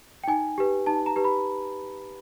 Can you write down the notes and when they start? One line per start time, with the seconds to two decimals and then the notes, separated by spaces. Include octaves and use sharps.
0.24 G5
0.27 D#4 G#5
0.58 G4 B4
0.86 D#4 A5
1.06 A#5
1.16 G4 B4
1.24 B5